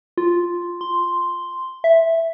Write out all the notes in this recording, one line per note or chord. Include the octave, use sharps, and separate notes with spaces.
F4
C6
E5